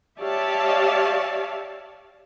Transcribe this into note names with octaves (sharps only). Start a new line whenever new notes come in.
G4 C#5 D5 E5 F5 A5